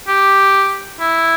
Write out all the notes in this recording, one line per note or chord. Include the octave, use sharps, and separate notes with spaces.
G4
E4